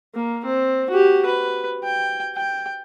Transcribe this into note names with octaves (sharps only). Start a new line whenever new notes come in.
A#3
C4
F#4 G4
B4
G5
G5